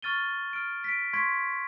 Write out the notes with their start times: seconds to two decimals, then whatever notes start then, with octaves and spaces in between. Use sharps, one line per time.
0.02 C#6 F6 A6 D#7 G7
0.53 F6 D7
0.84 B6 D7
1.13 C6 C#6 G#6 B6 D7